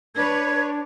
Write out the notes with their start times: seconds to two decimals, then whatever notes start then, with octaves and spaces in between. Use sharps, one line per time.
0.16 D4 B4 C#5 G#6